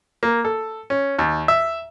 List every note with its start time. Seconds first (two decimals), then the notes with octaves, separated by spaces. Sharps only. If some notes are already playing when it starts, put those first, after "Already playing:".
0.23 A#3
0.45 A4
0.90 C#4
1.19 D#2
1.48 E5